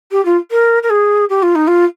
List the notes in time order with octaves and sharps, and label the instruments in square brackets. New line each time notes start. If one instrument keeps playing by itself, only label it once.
[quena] G4
F4
A#4
A#4
G#4
G4
F4
D#4
F4